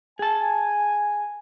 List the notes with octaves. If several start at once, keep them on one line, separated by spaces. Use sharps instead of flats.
G#4 G#5 A5